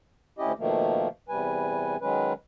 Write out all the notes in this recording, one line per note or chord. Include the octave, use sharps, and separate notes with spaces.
D2 C#4 E4 G4 D#5
B2 D#3 F3 A3 A#3
E2 C3 G3 B4 G#5
D#3 F#3 G#3 C#4 B4